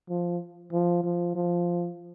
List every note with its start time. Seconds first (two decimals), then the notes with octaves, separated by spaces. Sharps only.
0.09 F3
0.73 F3
1.04 F3
1.35 F3